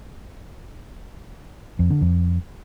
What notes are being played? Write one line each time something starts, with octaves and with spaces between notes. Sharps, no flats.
F2
D3
F2